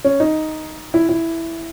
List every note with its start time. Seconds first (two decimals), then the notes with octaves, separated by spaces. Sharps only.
0.04 C#4
0.20 D#4
0.94 E4
1.09 E4